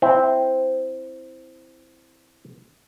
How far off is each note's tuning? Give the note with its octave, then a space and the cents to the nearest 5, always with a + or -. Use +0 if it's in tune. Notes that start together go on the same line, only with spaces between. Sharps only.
C4 +0 E4 +5